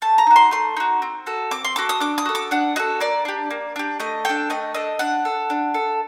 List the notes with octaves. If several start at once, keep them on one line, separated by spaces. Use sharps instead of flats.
A3 A5
A#5
D#4 F#4
C6
A3 C6
D#4 F#4
C4
F#4 A4
C4 D6
C6
F#4 A4 D6
D#6
D4 D6
D#6
F#4 A4
D6
D4 F#5
F#4 A4 D#5
A#3 D5
D4 G4
A#3
D4 G4
A3 D#5
D4 A4 G5
A3 D#5
D4 A4 D#5
D4 F#5
A4
D4
A4